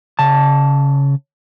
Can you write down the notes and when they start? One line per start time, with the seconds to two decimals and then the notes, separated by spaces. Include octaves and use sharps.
0.19 C#3 A5